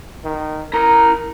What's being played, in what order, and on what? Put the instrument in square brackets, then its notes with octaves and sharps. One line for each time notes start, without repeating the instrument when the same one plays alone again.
[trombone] D#3
[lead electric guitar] E4 A#5 [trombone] A#4